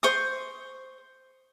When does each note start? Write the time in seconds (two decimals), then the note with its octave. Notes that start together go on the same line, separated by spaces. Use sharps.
0.03 C5 C#6 D#6